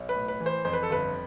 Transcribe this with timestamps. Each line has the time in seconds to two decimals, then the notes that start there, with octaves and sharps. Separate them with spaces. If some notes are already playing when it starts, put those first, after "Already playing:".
Already playing: B1
0.09 B4
0.15 A2
0.28 B4
0.40 E3
0.46 C5
0.65 F2 C5
0.73 B4
0.83 A4
0.90 G1 B4